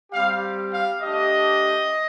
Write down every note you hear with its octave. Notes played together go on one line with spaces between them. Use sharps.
G3 C4 G4 F5
F5
A3 D4 G4 D#5